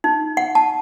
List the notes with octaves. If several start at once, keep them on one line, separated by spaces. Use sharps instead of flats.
D#4
F#5
A5